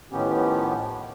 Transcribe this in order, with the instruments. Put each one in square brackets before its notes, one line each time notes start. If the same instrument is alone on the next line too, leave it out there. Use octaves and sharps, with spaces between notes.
[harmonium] A2 D#3 F3 B3 C#4 G4